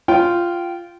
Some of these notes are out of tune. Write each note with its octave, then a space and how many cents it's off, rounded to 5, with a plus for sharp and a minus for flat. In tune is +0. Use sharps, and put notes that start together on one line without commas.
F4 -10 C#5 -5 G5 -20